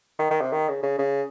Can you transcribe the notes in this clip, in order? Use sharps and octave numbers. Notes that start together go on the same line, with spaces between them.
D#3
D#3
C3
D#3
C#3
C#3
C#3